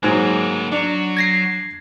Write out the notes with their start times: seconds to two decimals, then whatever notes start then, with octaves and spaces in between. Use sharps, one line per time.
0.03 G#2 F#3 G#3 A#3 B3
0.72 F#3 D4
1.17 G#6 A#6 C7